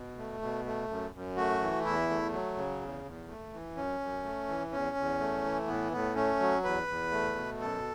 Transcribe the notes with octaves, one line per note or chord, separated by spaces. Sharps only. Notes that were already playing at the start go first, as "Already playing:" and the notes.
Already playing: B2
A3
B2
A3
F#2
F#2
A3 F#4
E3
E2 E4
A3
F#3
C#3
E2
E2
A3
E3
F#2 C#4
F#2
A3
E3
E2 C#4
E2
A3
E3
A2 B3
A2 B3
A3 C#4
F#3
E2 B4
E2
A3
B2
F#2 A4